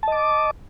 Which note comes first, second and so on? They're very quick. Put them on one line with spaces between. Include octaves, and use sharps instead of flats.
A5 D#5 D6